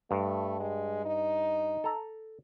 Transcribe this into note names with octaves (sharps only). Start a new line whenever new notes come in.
G2 A3
G#3
D#4
A4 A#5